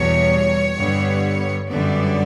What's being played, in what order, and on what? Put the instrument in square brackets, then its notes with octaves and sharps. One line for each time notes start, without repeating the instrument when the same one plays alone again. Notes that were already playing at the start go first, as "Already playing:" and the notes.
Already playing: [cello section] E2 B2 G3 C#5
G2 D3 G3 B3
F#2 D3 G3 B3 D5